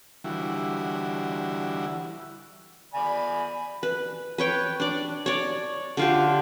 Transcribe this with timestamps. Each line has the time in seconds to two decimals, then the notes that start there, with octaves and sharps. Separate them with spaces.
0.24 D3 E3 G3 E4 F#4
2.94 D5 G#5 B5
3.83 B4
4.38 B4 C#5 G5
4.80 D4 D5
5.26 C#5 D5
5.97 D3 F4 G4